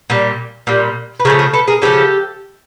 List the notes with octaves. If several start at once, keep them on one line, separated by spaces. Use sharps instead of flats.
A#2 G3
A#2 G3
B4
C#3 F3 A3 G#4 A#4
G#4 A#4
A4 B4
G#4 A#4
C#3 F3 A3 G4 A4